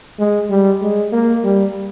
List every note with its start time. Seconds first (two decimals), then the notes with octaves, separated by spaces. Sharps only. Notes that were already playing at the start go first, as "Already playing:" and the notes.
0.19 G#3
0.50 G3
0.82 G#3
1.12 A#3
1.44 G3